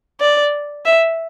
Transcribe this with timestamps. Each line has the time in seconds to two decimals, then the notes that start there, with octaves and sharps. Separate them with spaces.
0.20 D5
0.85 E5